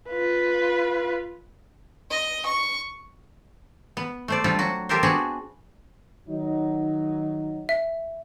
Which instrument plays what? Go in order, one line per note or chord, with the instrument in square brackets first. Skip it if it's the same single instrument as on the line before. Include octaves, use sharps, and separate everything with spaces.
[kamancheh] F4 B4
[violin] D#5
C#6
[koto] B3
A3 C5 D5
F3 G3 C4 D4 F4
F#3 F#4
F4 G4 A4 A#4 C5
B3 C4 D4 F#4 G#4
[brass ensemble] D#3 F#3 D#4
[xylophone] E5